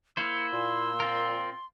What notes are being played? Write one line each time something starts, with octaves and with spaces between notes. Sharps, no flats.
A#3 E4 C5 E6 C#7
A#2 C6
C4 F4 A#4